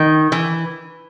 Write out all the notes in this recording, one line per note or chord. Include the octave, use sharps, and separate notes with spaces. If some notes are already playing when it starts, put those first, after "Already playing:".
Already playing: D#3
E3